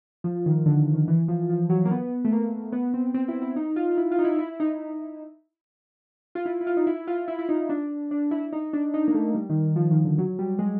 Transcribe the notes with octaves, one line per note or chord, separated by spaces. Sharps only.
F3
D#3
D3
D3
D#3
E3
F3
F3
F#3
A#3
B3
A3
A#3
B3
C4
C4
E4
E4
D#4
F4
E4
F4
D#4
E4
D#4
E4
D#4
F4
E4
E4
F4
D#4
E4
F4
E4
E4
D#4
D4
D4
E4
D#4
D4
D#4
A#3
A3
G3
D#3
F3
D#3
D3
F#3
G3
G#3